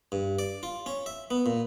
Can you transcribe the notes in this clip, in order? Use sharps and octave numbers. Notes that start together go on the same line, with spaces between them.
G2
D5
F4
C#4
E5
B3
A#2